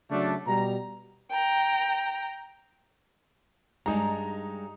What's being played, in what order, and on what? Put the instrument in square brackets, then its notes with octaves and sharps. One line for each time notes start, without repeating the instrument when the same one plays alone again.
[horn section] C#3 F#3 A3 D4
B2 G3 A#5
[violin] G5 A#5
[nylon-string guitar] G2 G3 G#3 [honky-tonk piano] D#4 A#5